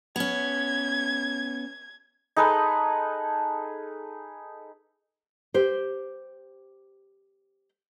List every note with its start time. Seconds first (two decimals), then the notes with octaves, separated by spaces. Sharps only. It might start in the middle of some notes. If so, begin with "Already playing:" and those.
0.16 B3 C#4 G#6
2.36 D#4 G#4 A4 B4
5.54 G4 C5